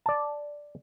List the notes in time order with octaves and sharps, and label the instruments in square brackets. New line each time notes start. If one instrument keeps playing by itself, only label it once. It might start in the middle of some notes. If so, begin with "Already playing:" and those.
[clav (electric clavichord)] D5 A5